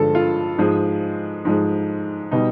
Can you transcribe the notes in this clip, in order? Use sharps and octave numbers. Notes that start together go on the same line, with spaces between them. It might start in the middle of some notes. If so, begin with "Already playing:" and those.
Already playing: G2 D3 F3 G#3 A4
F4
G#2 F3 G#3
G#2 F3 G#3
B2 G3 D#4